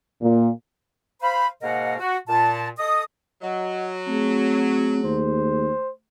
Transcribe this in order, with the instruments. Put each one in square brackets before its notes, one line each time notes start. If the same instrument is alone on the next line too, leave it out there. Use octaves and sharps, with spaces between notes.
[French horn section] A#2
[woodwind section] C5 F5 B5
G#2 B2 A#3 A#4 D#5 F#5
F#4
A#2 A5
A4 D#5 D#6
[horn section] F#3 [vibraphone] D#5 F#5
[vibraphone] A3 G#4 [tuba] C4
[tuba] D#2 [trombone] C5